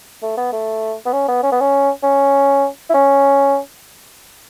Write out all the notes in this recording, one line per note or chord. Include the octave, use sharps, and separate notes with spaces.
A3
B3
A3
B3
C#4
B3
C#4
B3
C#4
C#4
E4
C#4